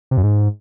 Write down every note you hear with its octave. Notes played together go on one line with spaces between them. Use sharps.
C3
F#2
G#2